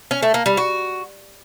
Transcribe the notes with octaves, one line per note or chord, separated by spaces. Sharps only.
C#4
A3
A#3
G3
F#4